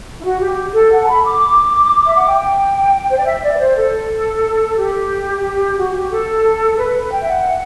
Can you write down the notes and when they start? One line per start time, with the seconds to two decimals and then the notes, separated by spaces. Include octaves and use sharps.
0.19 E4
0.24 F#4
0.40 G4
0.74 A4
0.91 F#5
1.01 A5
1.08 B5
1.25 D6
2.07 E5
2.16 F#5
2.25 G5
3.10 C5
3.18 D5
3.25 E5
3.43 D5
3.55 B4
3.59 C5
3.76 A4
4.76 G4
5.77 F#4
5.94 G4
6.11 A4
6.77 B4
6.95 B4
7.11 G5
7.22 E5
7.28 F#5